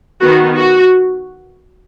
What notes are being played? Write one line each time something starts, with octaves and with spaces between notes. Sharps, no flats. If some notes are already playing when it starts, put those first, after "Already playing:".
D#3 B3 F#4
F#4